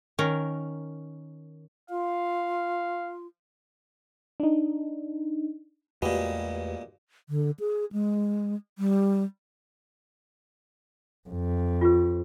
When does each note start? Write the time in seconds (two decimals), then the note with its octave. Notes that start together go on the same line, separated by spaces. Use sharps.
0.19 D#3 C#4 A#4
1.90 F4 F5
4.40 D4 D#4
6.02 E2 A#2 G#3 A3 F#4 G4 B4
7.29 D3
7.60 G#4
7.92 G#3
8.78 G3
11.29 F2
11.81 F4 G4 B4